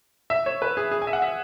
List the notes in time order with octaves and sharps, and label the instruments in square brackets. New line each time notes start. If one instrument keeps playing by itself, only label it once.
[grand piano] E5
C#5
B4
G#4
G#4
G#5
E5
F#5
E5